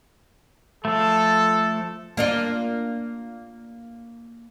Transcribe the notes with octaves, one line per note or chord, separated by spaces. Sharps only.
F3 A3 A4
A#3 D4 F4